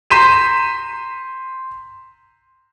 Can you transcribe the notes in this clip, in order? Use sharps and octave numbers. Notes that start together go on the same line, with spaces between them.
A#5 C6 G6 B6 D#7 E7